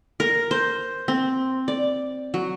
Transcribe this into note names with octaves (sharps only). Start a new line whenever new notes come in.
A#4
C5
C4
D5
F#3